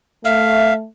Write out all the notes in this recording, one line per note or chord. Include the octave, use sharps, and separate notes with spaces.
A3 E5 F5